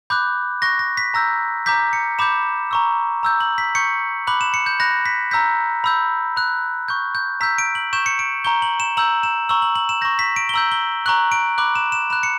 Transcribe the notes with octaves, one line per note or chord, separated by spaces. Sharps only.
B5 D6 F#6 G6
C#6 F#6 A#6
A#6
B6
A#5 E6 G6 A#6
A#5 D6 G6 B6
C#7
B5 D6 G6 E7
A#5 C#6 E6
A#5 E6 G6
F#7
B6
C#6 G6 C#7
B5 D6 F#6 F#7
E7
C#7
G6
B5 F#6 A#6
B6
A#5 E6 G6 B6
B5 E6 G6
B5 F#6
C#6 G6
G6
A#5 E6 G6 B6
D7
F#7
C#6 G6 E7
C#7
D7
A#5 C#6 G6 G7
F#7
E7
A#5 E6 G6 F#7
E7
A#5 C#6 E6 F#7
F#7
F#7
E7
C#6 G6 A#6
B6
D7
G7
A#5 E6 G6 F#7
G7
A#5 C#6 F#6 F#7
D7
B5 D6 F#6 F#7
E7
E7
B5 F#6 E7
C#7